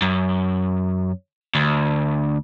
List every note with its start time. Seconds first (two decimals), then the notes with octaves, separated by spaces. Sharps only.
0.02 F#2
1.55 D2